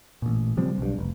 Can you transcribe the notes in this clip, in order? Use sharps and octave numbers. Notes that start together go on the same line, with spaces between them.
A1 A#2
C#3 F3 G3 C4
B1 G2
F1